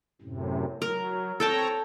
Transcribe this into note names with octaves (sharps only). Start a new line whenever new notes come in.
F#2 A2 C3
F#3 A#4
C4 A4 C#5 G5 A5 A#5